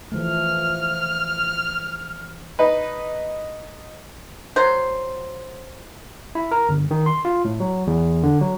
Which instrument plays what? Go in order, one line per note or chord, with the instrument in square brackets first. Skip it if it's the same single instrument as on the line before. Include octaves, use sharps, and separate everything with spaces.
[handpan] E3 F3 A3 [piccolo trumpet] F6
[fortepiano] D#4 B4
[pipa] F#3 C5
[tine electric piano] E4
A#4
G1
D#3
C6
F4
A2
F#3
E2
D3
F#3